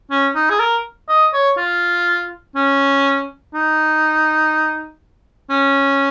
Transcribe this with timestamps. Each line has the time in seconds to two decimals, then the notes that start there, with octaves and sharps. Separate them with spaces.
0.11 C#4
0.35 D#4
0.50 G#4
0.60 A#4
1.09 D#5
1.33 C#5
1.57 F4
2.55 C#4
3.54 D#4
5.50 C#4